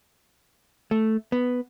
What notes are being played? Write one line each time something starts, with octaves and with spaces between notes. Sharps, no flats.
A3
B3